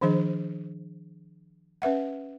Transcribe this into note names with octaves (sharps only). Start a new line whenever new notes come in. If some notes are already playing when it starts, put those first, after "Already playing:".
D#3 F3 D4 G#4 C5 D#5
C#4 B4 E5 F#5